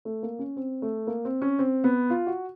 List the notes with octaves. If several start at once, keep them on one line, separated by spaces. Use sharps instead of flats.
A3
A#3
C#4
C4
A3
A#3
C4
C#4
C4
B3
F4
F#4